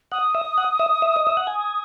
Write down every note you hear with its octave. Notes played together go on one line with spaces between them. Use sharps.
F#5 D#6
E5
F#5
E5
E5
D#5
E5
F#5
G#5